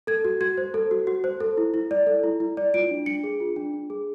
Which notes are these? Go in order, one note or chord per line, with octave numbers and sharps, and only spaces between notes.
A4 G#6
F#4
F#4 G#6
C5
A4
F#4
F#4
C5
A4
E4
E4
D5
A4
E4
E4
D5
F4 D7
D4
D4 C#7
G#4
F4
D4
D4
G#4